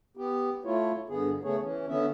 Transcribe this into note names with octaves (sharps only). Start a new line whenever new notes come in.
B3 G4
A3 E4 F4 C#5
G2 D3 B3 G#4
C#3 A3 B3 G#4 C#5
E3 C#4
D3 B3 C#4 E5